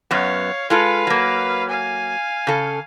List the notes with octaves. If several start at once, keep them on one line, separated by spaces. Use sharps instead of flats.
F#2 B3 C#5 F5
G#3 F4 A4 B4 F5
F#3 A#3
F5 G#5
C#3 A4